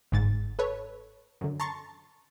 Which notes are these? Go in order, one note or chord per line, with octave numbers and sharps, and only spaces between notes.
G1 G#2 A6
A4 B4 C#5
F#2 D3
A5 A#5 C6 C#6 A6